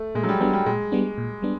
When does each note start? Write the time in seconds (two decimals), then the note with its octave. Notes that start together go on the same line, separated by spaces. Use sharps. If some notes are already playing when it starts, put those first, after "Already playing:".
Already playing: A3
0.15 A#2 G#3
0.23 F#3
0.29 G3
0.40 F#3 G3 B3 D4
0.53 G3
0.66 A#2 G#3
0.92 G3 B3 D4
1.18 A#2
1.42 G3 B3 D4